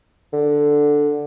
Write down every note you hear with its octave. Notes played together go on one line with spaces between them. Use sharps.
D3